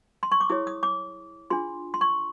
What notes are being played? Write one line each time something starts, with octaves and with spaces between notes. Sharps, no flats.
C6
C#6
D6
E4 G#4 C#5 D#6
D#6
D6
D4 F4 G#4 C6
C6
C#6